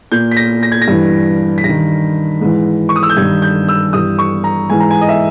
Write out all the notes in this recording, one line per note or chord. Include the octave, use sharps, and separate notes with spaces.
A#2 G6
B6
A#6
A#6
G#6
A#6
G2 E3
B6
G2 D#3 A#6
G#2 E3
C#6
D#6
E6
G6
G2 D#3 G#6
G6
E6
G2 E3 D#6
C#6
A#5
G#2 E3 G#5
A#5
G#5
D#5
E5